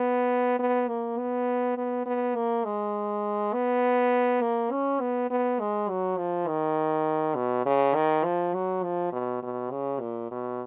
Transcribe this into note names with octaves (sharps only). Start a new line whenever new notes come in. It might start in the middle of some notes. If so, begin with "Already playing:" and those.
Already playing: B3
B3
A#3
B3
B3
B3
A#3
G#3
B3
A#3
C#4
B3
B3
G#3
F#3
F3
D#3
B2
C#3
D#3
F3
F#3
F3
B2
B2
C#3
A#2
B2